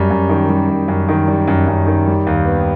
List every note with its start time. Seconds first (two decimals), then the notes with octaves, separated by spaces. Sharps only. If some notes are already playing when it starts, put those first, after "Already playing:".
Already playing: F#2 G3
0.11 F#2
0.29 D#3
0.49 G3
0.70 F#2
0.88 F#2
1.08 D#3
1.28 G3
1.47 F#2
1.68 F#2
1.87 D#3
2.07 G3
2.27 D#2
2.45 B3